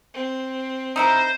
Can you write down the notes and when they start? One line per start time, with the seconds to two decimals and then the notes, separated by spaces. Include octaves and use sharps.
0.14 C4
0.96 D#4 E4 A#4 C5